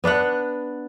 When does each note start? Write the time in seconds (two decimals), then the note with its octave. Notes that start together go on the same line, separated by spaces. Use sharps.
0.04 B3 D4 B4 F#5